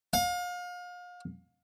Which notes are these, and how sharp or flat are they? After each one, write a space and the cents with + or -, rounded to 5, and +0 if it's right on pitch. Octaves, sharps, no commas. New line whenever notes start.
F5 +35